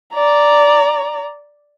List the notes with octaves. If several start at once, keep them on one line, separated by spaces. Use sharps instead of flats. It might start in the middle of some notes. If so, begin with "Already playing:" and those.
D5 A#5